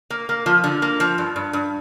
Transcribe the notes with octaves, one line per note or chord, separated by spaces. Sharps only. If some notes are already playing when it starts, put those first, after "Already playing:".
A#3
A#3
F3
D3
A#3
F3
G2
G2
G2